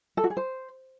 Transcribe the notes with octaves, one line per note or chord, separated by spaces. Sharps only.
A4
F#4
G#4
C5